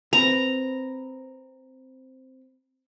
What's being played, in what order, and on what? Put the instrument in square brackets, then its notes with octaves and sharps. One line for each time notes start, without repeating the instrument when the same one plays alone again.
[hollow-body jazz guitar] C4 B4 [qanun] A#5